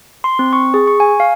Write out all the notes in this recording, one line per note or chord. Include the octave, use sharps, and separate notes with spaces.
C6
C4
C#6
G#4
C#6
G#5
F5